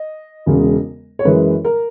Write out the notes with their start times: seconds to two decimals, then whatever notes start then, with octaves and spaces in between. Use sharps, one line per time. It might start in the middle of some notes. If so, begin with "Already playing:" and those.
Already playing: D#5
0.46 E1 E2 C#3 G#3
1.19 C#5
1.25 F#2 E3 G#3 B4
1.65 A#4